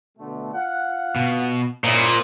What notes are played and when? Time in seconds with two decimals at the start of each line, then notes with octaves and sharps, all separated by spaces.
0.18 B2 D3 A3
0.53 F4 F5 F#5
1.16 B2
1.84 A#2 C#4 E4 C5 D#5